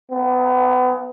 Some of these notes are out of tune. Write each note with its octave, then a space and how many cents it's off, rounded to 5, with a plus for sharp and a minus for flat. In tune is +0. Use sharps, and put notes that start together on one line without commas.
B3 +35